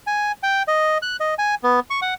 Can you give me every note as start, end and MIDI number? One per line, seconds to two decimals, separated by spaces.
0.07 0.32 80
0.43 0.63 79
0.68 0.98 75
1.02 1.17 90
1.20 1.34 75
1.38 1.55 80
1.63 1.80 59
1.90 2.00 85
2.02 2.14 78